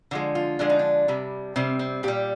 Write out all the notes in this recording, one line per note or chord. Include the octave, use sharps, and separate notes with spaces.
D3 F3 G#3
F4
D3 F3 G#3 D4
D#4
D4
C3 G3
C3 G3 C4
C4
A#2 G3 G4